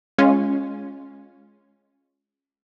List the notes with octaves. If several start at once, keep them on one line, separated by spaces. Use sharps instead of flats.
G#3 C#4 F4